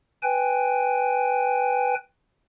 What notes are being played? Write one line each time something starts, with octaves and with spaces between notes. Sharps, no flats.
B4 G5 G#5